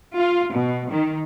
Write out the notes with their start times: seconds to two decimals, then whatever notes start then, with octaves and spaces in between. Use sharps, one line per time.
0.17 F4
0.52 B2
0.91 D#3